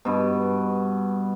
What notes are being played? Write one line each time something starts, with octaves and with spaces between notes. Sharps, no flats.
G2 B2